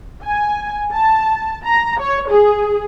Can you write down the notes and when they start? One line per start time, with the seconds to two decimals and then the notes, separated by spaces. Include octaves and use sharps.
0.25 G#5
0.93 A5
1.66 A#5
2.00 C#5
2.30 G#4